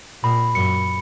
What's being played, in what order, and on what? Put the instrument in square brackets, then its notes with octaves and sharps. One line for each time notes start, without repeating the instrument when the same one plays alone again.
[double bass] A#2 [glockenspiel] B5
[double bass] F#2 [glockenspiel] C#7